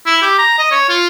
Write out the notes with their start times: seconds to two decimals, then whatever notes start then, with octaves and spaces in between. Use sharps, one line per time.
0.06 E4
0.22 G4
0.38 A#5
0.58 D#5
0.71 C#5
0.89 F4